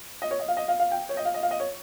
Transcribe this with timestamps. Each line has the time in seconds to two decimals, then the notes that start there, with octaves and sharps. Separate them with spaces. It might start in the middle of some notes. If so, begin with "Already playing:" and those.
0.22 D#5
0.31 C#5
0.39 D#5
0.48 F5
0.57 D#5
0.68 F5
0.80 F5
0.92 G5
1.09 C#5
1.17 D#5
1.25 F5
1.34 D#5
1.43 F5
1.51 D#5
1.60 C#5